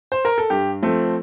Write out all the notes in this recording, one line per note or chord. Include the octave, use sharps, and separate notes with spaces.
C5
A#4
A4
G2 G4
F3 A3 C4